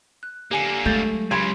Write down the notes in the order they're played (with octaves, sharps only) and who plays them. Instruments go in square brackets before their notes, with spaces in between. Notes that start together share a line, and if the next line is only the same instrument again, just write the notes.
[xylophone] F#6
[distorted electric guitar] D3 A#3 [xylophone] G4 G#5 C#7
[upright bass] F#3 G#3 [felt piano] A3 [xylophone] G6 A6
[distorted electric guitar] C#2 C#3 [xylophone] G4 [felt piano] B5 C6 G#6